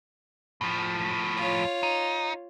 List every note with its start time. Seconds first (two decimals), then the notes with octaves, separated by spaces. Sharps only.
0.61 A2 F3
1.37 F4 C#5
1.83 D#4